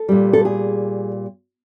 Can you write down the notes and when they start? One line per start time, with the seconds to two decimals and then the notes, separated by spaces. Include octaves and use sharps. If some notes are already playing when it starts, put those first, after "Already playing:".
Already playing: A4
0.08 A#2 G3
0.33 A4
0.45 G#4